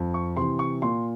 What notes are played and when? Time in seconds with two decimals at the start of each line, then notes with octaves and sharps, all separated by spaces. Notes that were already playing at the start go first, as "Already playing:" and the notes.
Already playing: F2
0.14 C#6
0.37 C3 E3 C6
0.59 C#6
0.82 A#2 C6